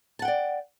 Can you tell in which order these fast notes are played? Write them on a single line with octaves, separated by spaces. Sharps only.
A5 F#5 G5 D5